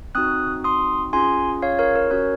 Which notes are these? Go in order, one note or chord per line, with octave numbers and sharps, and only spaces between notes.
C4 D#4 F#4 D#6 F#6
C6 D#6
C#4 F4 G#4 G#5 C6
C#5 F5
A#4 C#5
A#4
C#4 F#4 A#4 C#5